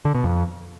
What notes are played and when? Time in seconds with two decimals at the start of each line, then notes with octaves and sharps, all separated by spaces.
0.05 D3
0.15 B2
0.24 F2